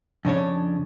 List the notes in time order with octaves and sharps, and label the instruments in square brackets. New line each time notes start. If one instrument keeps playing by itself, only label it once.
[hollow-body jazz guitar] F2 C#3 D4 C#5